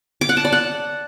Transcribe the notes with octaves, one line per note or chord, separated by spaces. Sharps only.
D6
F#5
A5
D5
F#5